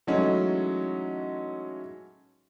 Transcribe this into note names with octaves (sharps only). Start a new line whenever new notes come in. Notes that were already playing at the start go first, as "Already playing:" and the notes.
E3 F#3 G#3 A3 C#4 D#4